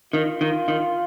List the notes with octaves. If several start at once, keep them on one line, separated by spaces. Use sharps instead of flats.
D#3 F4
D#3
D#3